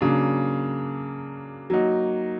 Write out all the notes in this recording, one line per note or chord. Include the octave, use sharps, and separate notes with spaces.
C#3 F#3 A#3 D4
F#3 A#3 D#4 F#4